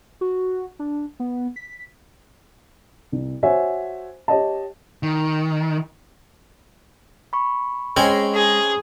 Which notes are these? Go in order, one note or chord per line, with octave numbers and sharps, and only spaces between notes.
F#4
D4
B3
B6
C2
F#4 C5 C#5 E5 F#5 G#5
G4 C#5 D#5 A5
D#3
B5 C#6
G#3 C4 C#4 G#5
G#4